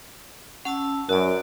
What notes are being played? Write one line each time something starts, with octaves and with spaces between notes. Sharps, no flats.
C#4 F#5 A5 E6
F#2 F#4 A#4 D5